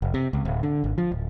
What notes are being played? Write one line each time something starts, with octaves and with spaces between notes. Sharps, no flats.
F1
C3
C#2
D1
D3
G#1
F3
D1